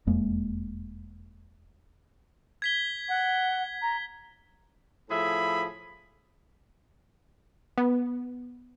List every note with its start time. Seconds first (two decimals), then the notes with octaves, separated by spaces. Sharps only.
0.07 E1 F2 G#3 A#3
2.62 G#6 B6 G7
3.09 F#5
3.82 A#5
5.10 A2 F3 G#4 E5 B5
7.78 B3